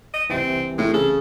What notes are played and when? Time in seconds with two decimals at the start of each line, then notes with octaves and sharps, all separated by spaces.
0.14 D#5
0.30 C2 C3 E3 C4
0.78 A2 G#3
0.94 C#3 A4